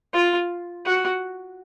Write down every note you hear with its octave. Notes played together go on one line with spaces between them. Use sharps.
F4
F#4